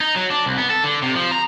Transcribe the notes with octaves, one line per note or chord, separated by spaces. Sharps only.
D#4
F#3
D4
C2
B3
A4
D3
C3
F3
A#5